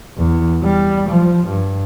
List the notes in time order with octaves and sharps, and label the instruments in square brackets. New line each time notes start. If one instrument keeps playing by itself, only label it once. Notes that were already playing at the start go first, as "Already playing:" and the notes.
[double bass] E2
G3
F3
G2